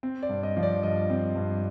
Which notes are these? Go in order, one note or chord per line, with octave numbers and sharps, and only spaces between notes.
C4
D5
G2
D#5
F3
D5
G2 D#5
C4
G2